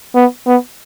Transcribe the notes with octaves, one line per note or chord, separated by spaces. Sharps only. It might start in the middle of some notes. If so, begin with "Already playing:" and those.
B3
B3